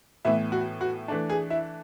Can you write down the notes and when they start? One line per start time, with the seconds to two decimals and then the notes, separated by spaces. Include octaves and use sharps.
0.25 A2 E3 B3 E4
0.52 F#4
0.81 F#4
1.08 E3 A3 D4
1.30 G#4
1.50 E4